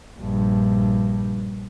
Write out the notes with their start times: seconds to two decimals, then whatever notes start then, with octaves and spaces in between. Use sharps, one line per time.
0.18 A#1 G2